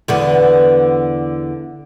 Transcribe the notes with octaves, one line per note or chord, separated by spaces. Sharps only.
E2 D3 B3